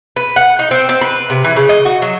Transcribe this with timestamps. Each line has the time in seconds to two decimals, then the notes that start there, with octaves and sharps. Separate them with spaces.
0.16 B4
0.36 F#5
0.59 D#4
0.71 C4
0.89 C4
1.01 B4
1.30 C3
1.44 E3
1.56 C#3
1.69 D#5
1.85 F#4
2.02 F#3